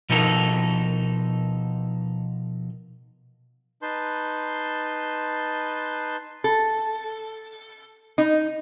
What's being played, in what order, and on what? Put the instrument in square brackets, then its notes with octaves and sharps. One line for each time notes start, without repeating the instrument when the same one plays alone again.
[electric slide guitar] B2 F3 D#4 A4 A#4
[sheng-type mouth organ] D#4 B4 A5 C6 G6
[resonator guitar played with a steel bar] A4
D#4